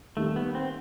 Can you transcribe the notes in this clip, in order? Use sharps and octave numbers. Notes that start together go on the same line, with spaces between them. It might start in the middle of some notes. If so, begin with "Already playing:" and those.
D#3 G3 A3 A#3
B3
C4